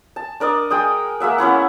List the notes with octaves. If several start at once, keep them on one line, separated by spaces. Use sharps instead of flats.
A5
D4 A#4 D5 D#5
G#3 G5 D#6
G#3 A#3 E5 F#5
B3 C#4 E4 F#5